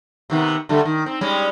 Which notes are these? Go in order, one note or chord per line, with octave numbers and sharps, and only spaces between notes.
C3 D#3 B3
D3 G3 A3
D#3
C4
G3 G#3 C#4